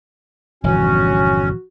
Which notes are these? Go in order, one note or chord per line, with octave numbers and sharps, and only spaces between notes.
G1 E2 A#2 E3 F3 C#4 F#4